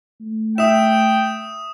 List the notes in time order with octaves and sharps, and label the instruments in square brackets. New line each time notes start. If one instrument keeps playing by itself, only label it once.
[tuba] A3
[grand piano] E5 [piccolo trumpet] G5 [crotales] D#6 E7